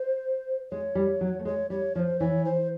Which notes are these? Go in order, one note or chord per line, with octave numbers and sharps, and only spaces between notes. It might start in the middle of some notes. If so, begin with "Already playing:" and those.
Already playing: C5
G#3 C#5
G3
F#3
A3
G#3 C#5
G3 C#5
F3 C#5
C5
E3 C#5
C5